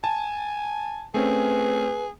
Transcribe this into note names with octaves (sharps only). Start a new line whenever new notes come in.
G#5 A5
A3 C4 C#4 G#4 B4